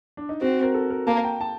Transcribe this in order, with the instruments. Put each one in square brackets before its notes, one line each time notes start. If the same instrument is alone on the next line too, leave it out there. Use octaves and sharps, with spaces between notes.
[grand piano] D4
D#4
[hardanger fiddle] C4 [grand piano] F#4
[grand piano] A#4
A4
A#4
[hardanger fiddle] A#3 [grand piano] A5
[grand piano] G5
A5